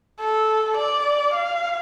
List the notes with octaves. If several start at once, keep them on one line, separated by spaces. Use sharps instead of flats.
A4
D5
F5